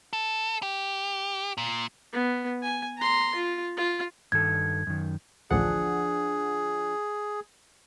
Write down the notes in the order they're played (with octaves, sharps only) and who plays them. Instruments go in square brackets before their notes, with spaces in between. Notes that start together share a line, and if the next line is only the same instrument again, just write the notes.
[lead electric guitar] A4
G4
A#2
[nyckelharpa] B3
G#5
A#5 C6
F4
F4
[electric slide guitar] G2 D#3 A4 [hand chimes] G#6
[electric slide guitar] F#2 D#3
[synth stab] A1 D2 [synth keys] F3 D4 F#5 [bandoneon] G#4